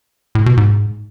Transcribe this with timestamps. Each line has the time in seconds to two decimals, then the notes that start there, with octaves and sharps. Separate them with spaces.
0.35 A2
0.46 B2
0.57 G#2